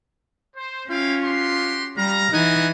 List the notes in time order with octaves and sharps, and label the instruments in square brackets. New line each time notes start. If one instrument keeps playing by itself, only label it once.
[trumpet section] C5
[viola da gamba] C#4 [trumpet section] E4 F5 G5 [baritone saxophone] F4
[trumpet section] F#4 G4 C6
[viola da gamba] G3 [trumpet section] F5 A#5
[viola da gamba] E3 [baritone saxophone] D#4 [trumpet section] D#5 F#5 G#5